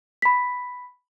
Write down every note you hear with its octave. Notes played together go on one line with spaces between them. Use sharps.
B5 B6